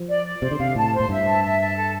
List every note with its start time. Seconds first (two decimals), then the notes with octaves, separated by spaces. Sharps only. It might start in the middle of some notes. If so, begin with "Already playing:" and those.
Already playing: F3
0.09 D5
0.25 D5
0.42 C3 C5
0.51 D3
0.59 C3 F5
0.76 A2 A5
0.93 C5
1.00 A2
1.09 G2 E5
1.27 A5
1.43 E5
1.60 A5
1.77 A4